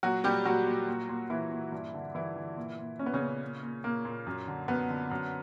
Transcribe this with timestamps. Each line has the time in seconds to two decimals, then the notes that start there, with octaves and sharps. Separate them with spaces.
0.03 A#2 F#3 F#4
0.24 A#2 G3 G4
0.45 A#2 F#3 F#4
0.66 A#2
0.88 A#2
1.09 A#2
1.30 A#2 E3 E4
1.52 A#2
1.72 G2
1.94 D3
2.15 G2 E3 E4
2.36 D3
2.57 A#2
2.79 A#2
2.99 A#2 C#4
3.06 B3
3.14 C#3 C#4
3.21 A#2
3.42 A#2
3.63 A#2
3.84 A#2 A#3
4.05 A#2
4.27 F#2
4.47 D3
4.68 F#2 B3
4.90 D3
5.11 F#2